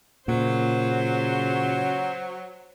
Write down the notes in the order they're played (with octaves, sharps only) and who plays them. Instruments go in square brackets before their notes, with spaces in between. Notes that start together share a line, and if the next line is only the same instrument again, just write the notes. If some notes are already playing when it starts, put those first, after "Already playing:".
[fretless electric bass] A#2 [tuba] C#3 [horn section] F#3 [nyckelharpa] C5